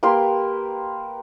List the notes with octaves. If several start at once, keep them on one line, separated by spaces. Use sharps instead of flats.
A#3 G4 B4 C6